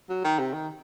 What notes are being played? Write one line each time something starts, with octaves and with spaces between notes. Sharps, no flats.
F#3
D#3
C3
D#3